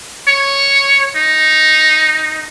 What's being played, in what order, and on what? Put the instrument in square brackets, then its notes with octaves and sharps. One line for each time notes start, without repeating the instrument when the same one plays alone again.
[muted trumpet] C#5
D#4